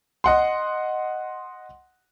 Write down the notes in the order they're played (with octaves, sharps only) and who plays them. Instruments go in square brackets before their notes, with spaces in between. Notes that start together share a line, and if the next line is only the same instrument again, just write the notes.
[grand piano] D#5 F#5 C6